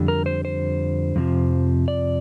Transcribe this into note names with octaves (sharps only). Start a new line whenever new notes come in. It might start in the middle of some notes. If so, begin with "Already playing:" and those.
Already playing: F2 D3 G3
A#4
C5
C5
F2 C3 F3
D5